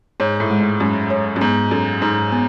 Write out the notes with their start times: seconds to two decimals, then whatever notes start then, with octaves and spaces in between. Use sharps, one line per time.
0.20 G#2 C#5
0.40 A2
0.51 G#3
0.60 G#2
0.80 F#2 G#3
1.10 C#5
1.36 F#2
1.41 G#2 B3
1.71 F#2 A4
2.02 G#2 D#4
2.32 B3